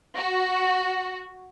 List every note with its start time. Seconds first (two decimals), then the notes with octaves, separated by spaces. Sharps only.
0.16 F#4